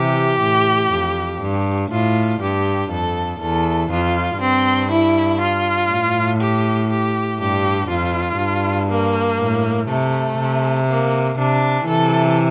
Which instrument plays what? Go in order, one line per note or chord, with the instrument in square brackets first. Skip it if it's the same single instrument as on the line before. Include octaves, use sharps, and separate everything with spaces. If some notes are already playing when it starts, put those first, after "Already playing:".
Already playing: [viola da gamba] C3 E3 [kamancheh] G4
[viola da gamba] A2
F2
G2
[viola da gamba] A2 [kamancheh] F4
[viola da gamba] G2 [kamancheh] G4
[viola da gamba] F2 [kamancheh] A4
[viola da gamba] E2 [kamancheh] A4
[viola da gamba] F2 [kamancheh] F4
[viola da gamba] G2 [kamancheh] C4
[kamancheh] E4
F4
[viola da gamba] A2
[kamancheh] G4
G4
[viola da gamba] G2 [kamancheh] G4
[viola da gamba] F2 [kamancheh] F4
[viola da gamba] G2
[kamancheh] A#3
[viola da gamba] A2
[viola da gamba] C3 [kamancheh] A3
[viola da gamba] C3
[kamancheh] A#3
[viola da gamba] C3 [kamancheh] D4
[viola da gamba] C3 E3 [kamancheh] A4